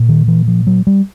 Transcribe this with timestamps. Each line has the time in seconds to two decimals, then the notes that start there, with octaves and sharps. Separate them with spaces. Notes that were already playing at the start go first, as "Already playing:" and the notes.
Already playing: A#2
0.09 D#3
0.28 E3
0.48 F3
0.67 F#3
0.87 G3